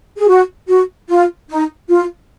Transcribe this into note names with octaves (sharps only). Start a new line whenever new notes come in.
G#4
F#4
F#4
F4
D#4
F4